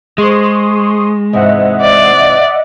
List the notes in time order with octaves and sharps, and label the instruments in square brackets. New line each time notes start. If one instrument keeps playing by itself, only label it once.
[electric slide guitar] G#3 [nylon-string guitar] G#4 C5 [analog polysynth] C6 C#6 D#6
[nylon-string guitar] G#2 C3 E3 [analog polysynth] D#5 E5 F#5
[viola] D5